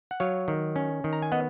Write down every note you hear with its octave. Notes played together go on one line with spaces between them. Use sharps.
F#5
F#3 C#5 F5
D#3
C#4
D#3
A#5
G#5
B3 D#5 F#5